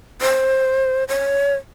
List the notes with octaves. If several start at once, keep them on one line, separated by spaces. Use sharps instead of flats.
C5
C#5